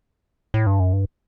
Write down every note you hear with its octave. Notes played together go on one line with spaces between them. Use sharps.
A2
G2
F#2
G2